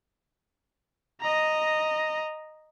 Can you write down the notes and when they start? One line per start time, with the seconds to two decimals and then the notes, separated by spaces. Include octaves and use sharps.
1.21 D#5 A#5